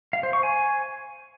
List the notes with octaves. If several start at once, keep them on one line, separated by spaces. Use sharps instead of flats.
F5
C5
C#6
G#5